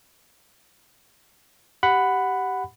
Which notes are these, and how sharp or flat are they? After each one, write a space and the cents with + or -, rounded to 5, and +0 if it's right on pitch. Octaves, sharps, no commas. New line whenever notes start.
G4 -10 F#5 +0 B5 +10